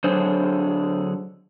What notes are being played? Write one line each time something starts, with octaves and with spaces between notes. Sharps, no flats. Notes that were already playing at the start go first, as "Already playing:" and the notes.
D3 F#3 D4 G#4 C5 C#5